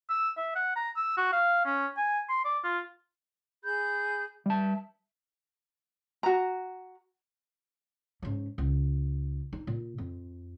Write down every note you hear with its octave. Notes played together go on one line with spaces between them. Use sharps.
E6
E5
F#5
A#5
E6
F#4
F5
C#4
G#5
C6
D5
F4
G#4 B5 G6
G3 E5 A5
F#4 A#5
G#2 C#4
C#2
D#4
A#2
F2